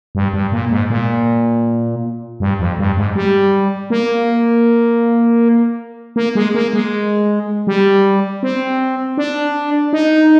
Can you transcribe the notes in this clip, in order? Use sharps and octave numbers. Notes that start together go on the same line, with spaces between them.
G2
G2
A#2
G#2
A#2
G2
F2
G2
G#2
G3
A#3
A#3
G#3
A#3
G#3
G3
C4
D4
D#4